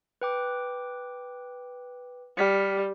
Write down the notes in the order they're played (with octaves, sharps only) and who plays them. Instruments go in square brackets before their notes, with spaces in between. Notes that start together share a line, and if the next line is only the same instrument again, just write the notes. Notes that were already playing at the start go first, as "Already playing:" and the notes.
[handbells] B4 G5 D6
[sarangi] G3 [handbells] F6 B6 C#7